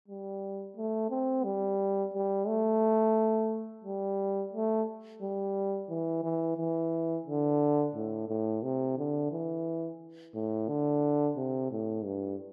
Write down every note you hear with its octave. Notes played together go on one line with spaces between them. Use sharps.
G3
A3
C4
G3
G3
A3
G3
A3
G3
E3
E3
E3
D3
A2
A2
C3
D3
E3
A2
D3
C3
A2
G2